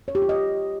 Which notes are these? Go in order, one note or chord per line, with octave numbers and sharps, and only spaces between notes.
C#5
G4
F4
D#5